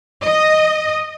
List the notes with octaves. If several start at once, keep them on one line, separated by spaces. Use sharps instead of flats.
D#5